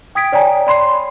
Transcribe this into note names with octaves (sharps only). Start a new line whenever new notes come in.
G5 D#6 G#6 B6 D7
C#5 D5 G5 G#5 A#5
D5 B5 C6 C7